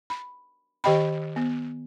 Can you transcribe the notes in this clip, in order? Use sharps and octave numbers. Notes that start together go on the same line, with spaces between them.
B5
D#3 G4 D#5 G5 B5
B3